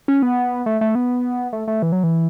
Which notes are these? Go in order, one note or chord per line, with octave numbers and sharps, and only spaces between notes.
C#4
B3
A3
A3
B3
A3
A3
E3
F#3
E3